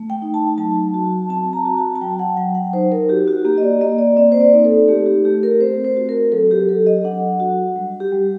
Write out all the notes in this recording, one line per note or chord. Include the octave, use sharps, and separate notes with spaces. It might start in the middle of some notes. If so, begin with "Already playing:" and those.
Already playing: A3
G5
D#4
A5
F#3 A5
F#4
C4 A5
A#5
F#4
A5
A5
F#3 G5
F#5
F#3 G5
F#5
D#4 C5
A#4
F#4 G4
F#4
A#3 G4
D#5
D5
A#3 D#5
D5
C4 D5
C5
D5
D#4
A4
A3 G4
G4
A3 G4
A#4
C4 C5
C5
F#4
A#4
F#3 A4
G4
F#3 A4
D#5
D4 F#5
F#4
G3
G4
G3